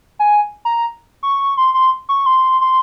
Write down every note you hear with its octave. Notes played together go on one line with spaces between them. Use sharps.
G#5
A#5
C#6
C6
C6
C#6
C6
C6